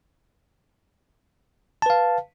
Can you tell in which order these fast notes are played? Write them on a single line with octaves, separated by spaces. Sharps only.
A5 B4 F5